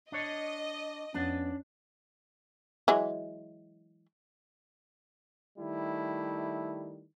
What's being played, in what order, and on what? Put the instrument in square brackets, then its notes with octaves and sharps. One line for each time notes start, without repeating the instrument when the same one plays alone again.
[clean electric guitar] D4 C#5 [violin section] D#5
[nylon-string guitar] F2 B3 [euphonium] C#4 [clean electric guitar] D4
[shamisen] E3 F#3 G#3
[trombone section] D#3 G3 A3 E4